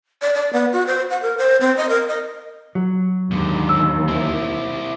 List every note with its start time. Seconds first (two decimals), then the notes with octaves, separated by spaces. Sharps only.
0.22 D5
0.34 D5
0.53 B3
0.73 F#4
0.87 C5
1.10 F#5
1.22 A#4
1.38 C5
1.61 C4
1.77 D#5
1.89 A#4
2.08 D#5
2.75 F#3
3.31 D#2 G#2 D3
3.69 E6
4.08 C4 E4